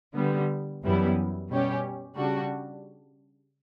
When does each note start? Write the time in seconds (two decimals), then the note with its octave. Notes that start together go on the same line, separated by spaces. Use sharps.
0.15 D3 G3 B3
0.83 F#2 E3 G3 B3 E4
1.50 B2 G3 C#4 G4
2.18 C#3 G3 D4 F#4